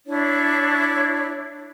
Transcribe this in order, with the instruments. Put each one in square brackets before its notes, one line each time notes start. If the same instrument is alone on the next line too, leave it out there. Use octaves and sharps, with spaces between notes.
[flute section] D4 E4 C#5